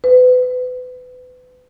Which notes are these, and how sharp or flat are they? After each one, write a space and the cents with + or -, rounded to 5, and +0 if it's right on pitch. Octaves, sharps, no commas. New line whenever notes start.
B4 +30